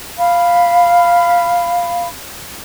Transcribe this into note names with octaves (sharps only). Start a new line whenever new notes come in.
F5 B5